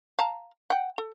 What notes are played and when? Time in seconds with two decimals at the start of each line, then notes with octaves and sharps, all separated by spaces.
0.19 F5 A5 A#5
0.70 F#5 G5
0.98 A4